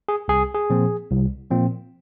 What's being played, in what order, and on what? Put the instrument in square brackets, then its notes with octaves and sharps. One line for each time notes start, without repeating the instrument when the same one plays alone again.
[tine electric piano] G#4
C2 G#4
G#4
A#2 F3 C4
C2
A#2 F3 C4